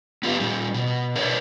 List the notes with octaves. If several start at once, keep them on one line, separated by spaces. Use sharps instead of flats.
B3 F4 G4 B4 F5
A#2 G3
B2
D4 A#4 B4 C#5 D5 E5